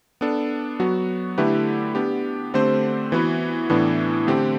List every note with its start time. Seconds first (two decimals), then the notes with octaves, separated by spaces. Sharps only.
0.21 B3 D4 A4
0.80 F#3 B3 F#4
1.38 D3 A3 E4 G4 B4
1.95 B3 D4 G4
2.54 D3 A3 C4 G4 C5
3.12 E3 B3 F#4 B4
3.70 A2 E3 B3 D4
4.27 D3 A3 C4 G4